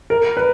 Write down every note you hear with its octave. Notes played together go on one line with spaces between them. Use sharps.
A#4
B4